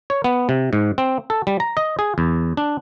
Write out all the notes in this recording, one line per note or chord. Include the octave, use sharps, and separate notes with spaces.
C#5
B3
C3
G#2
C4
A4
G3
A#5
D#5
G#4
E2
D4